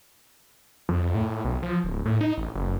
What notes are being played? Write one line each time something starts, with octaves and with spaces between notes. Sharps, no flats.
F2
A2
B1
F3
D1
A2
D#4
A1
F#1